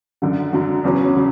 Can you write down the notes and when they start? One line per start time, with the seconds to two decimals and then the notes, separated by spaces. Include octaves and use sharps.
0.22 F#2 D3 F#3
0.53 F#2 D3 F#3
0.84 E2 C#3 F#3 C#4
1.16 C#3 F#3